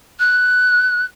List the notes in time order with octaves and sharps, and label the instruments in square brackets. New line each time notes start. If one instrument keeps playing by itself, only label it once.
[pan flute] F#6